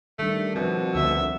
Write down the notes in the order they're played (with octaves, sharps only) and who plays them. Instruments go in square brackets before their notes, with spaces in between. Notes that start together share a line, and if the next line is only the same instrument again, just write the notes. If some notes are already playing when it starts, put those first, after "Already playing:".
[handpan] D#3 G3 D4 [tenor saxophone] A3
[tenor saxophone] B2 [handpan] F3 C4
[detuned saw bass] D2 [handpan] B3 [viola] E5